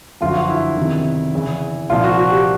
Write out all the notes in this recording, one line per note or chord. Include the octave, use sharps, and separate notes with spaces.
G1 F#2 D3 F3 F4
F#4
F4
E4
E2 C3 D#3
E2 C#3 E3
C2 A#2 F3 F4
F#4
F#4
G4